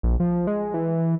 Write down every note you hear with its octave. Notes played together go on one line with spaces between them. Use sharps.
A#1
F3
G#3
E3